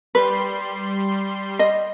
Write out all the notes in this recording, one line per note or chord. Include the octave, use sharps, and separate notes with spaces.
G3 B4 C6
D#5